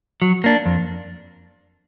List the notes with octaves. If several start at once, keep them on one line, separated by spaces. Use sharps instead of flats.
F#3
A#3 D4
F2